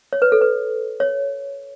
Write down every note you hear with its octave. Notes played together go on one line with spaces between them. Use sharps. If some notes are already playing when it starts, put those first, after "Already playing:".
C#5
B4
A4
B4
C#5